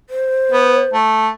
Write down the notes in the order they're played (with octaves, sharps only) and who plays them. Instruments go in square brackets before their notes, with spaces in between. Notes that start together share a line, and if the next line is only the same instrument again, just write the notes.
[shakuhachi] C5
[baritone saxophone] B3
A3